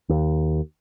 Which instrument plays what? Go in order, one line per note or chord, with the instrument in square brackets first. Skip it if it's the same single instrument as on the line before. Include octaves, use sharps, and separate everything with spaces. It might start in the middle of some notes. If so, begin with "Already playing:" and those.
[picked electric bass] D#2